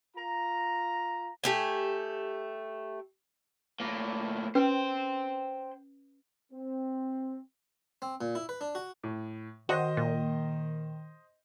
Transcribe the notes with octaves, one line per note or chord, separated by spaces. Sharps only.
F4 A#5
A3 G4 G#5
A2 A#3
C#4 B4 C5 G5
C4
C4
A#2
E4
B4
D4
F#4
A2
D#3 F#4 C5 D#5
A#2